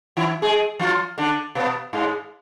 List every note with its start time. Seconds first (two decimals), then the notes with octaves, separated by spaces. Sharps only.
0.17 E3 E4
0.42 G#3 G#4
0.79 F3 F4
1.18 D3 D4
1.55 B2 B3
1.93 G#2 G#3